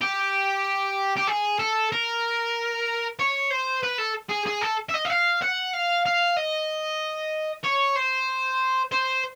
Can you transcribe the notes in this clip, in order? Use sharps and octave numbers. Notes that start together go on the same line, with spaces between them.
G4
G4
G#4
A4
A#4
C#5
C5
B4
A4
G#4
G#4
A4
E5
D#5
E5
F5
F#5
F5
F5
D#5
C#5
C5
C5